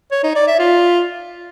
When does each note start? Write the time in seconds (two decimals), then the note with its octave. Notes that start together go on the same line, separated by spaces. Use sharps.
0.12 C#5
0.24 D#4
0.35 D5
0.47 E5
0.59 F4